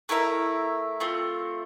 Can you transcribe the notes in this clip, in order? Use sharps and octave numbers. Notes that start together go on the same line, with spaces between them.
A3 E4 A#4 E5
A3 C4 F4